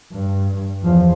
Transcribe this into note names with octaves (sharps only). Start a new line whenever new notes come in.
G2
E2 F3